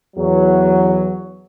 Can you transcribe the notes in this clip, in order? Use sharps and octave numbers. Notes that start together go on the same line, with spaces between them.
E2 F#3